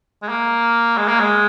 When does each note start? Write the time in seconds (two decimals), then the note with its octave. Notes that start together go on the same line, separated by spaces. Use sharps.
0.22 G#3
0.29 A#3
0.97 G#3
1.08 A#3
1.20 G#3